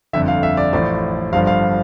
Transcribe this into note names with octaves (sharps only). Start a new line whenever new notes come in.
G1 F2 D3 E5
F5
E5
D5
A1 A2 F3 D5
G1 G2 F3 F5
F5